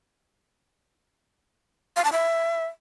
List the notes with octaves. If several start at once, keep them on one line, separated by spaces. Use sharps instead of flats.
F5
A5
E5